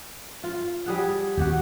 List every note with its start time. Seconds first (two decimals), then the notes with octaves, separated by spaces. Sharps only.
0.44 F4
0.86 G3 G#4 F#5
1.37 D#2 A3 A#3 F#4 G4